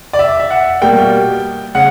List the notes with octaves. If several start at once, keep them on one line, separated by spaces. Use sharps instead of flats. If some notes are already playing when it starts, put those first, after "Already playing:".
D5
E5
E5
F#5
B2 G3 A#3 G5
C#3 F#5